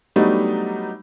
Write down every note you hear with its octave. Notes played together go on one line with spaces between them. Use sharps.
F#3 G3 A3 B3 D4 D#4